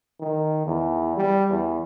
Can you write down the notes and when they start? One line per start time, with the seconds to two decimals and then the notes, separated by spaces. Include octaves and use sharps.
0.20 D#3
0.66 E2
1.16 G3
1.50 E2